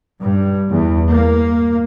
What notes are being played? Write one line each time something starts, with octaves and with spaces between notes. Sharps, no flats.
G2
E2
A#3